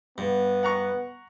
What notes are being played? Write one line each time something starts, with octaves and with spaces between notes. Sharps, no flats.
G2 B3
F#5 A#5 C#6